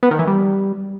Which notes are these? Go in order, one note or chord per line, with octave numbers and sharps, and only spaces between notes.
B3
D#3
E3
G3